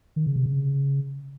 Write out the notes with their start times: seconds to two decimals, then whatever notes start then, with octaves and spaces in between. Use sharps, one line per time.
0.16 D#3
0.26 C#3
0.36 C3
0.46 C#3